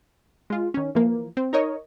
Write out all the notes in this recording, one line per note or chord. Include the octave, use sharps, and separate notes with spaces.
G#3 F4
D#3 C#4
E3 F3 A#3
C4
D#4 A#4 C#5 D#5